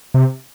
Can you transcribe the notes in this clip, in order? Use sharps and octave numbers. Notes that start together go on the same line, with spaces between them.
C3